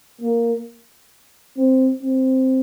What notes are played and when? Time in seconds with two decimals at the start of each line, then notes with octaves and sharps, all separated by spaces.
0.21 A#3
1.57 C4
2.02 C4